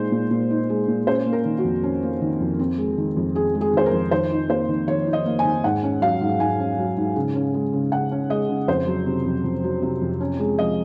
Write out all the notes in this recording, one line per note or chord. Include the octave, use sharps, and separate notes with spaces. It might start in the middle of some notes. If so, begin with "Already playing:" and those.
Already playing: A#2 G#3 D#4 C5
A#2
A#2
D#4
G#3
A#2
C#4 C5
A#3
A#4
D#3
F#4
F2
C#4
A#3
D#3
F2
C4
G#3
D#3
F2
C4 G#4
G#3
G#4
D#3 C5
A#4
F2
D#3 C5
D#4
A#3 C5
D#3
D#3 C#5
D#4
D#5
A#3
G#5
D#3
G#2 F#5
C#4
F#3 F5
G#2
G#2 G#5
C#4
F#3
G#2
C#3
C#4
G#3
C#3
C#3 F#5
C#4
G#3 D#5
C#3
F2 C5
F#3
C3
F2
F2
F#3
C3
F2
C#4
G#3
F3 D#5